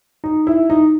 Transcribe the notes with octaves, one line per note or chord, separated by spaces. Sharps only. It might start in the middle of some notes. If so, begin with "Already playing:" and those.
D#4
E4
D#4